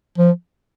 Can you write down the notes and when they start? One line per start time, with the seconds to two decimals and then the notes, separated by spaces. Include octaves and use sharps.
0.19 F3